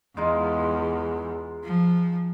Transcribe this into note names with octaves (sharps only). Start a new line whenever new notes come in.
E2 G#3 D#4 F4
F3